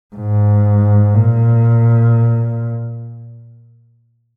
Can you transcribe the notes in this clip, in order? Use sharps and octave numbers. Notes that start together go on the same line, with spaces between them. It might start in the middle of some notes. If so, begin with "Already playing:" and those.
G#2
A#2